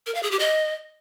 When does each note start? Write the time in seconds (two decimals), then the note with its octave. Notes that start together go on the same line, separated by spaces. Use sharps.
0.06 A#4
0.15 F5
0.23 G#4
0.31 G4
0.39 D#5